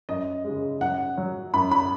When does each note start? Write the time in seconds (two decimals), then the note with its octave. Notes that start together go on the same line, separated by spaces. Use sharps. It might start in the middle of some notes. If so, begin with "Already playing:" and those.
0.09 F#2 D#5
0.44 C#3 G#3
0.81 F#2 F#5
1.17 F#3
1.54 F#2 B5
1.71 B5